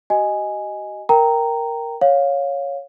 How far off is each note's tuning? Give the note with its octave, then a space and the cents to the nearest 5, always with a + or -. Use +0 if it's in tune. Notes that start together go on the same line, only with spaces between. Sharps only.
F#4 +45 D#5 +0 G#5 +0
A#4 +0 G5 +0 A#5 -10
C#5 +0 F5 +15